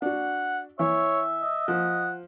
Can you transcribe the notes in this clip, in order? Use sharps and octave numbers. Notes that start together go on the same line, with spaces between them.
D4 F#4 F#5
E3 C#5 E5
D#5
F3 F#5